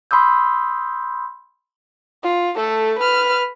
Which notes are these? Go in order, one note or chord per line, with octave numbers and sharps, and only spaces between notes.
B5 C6 D#6 E6 G6
F4
A3 A4
B4 F6